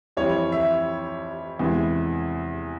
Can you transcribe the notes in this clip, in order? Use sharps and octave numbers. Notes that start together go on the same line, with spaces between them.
F2 E3 G3 C#5
E5
E2 C3 E3 G#3